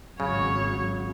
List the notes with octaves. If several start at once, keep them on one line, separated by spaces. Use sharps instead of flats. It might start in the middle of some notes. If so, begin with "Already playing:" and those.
G#1 C#3 F#3 C#5